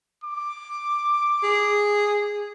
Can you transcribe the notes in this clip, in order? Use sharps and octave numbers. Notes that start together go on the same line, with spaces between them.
D6
G#4